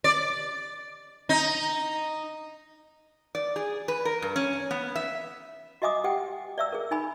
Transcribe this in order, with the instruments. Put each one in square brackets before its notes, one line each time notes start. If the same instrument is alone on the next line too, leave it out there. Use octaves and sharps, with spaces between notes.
[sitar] D5
D#4
[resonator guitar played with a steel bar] D5
G#4
B4
A#4
G2
C#4
B3
E5
[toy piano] F#4 D#5 E5 G#5 D6 D#6
G4 F#5 G5
D5 E5 E6
G#4 A#4
D#4 G#5 B5